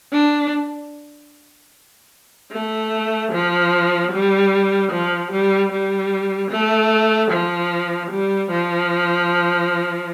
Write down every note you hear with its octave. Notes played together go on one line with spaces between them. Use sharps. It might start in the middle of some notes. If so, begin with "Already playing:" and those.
D4
A3
F3
G3
F3
G3
G3
A3
F3
G3
F3